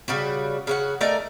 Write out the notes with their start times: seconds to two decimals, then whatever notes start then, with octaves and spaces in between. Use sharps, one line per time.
0.08 C#3 G3 F#4
0.67 C#3 F#4 F#5
1.01 A3 D#4 A#4 D5